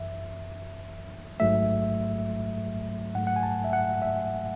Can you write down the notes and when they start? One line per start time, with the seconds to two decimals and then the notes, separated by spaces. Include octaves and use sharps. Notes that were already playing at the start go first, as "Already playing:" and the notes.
Already playing: G#1 F#2 E3 E5
1.40 A1 G#2 F#3 A3 E5
3.15 G#2 F#3 A3 F#5
3.27 F#5
3.36 G#5
3.43 A5
3.64 E5
3.73 F#5
4.02 E5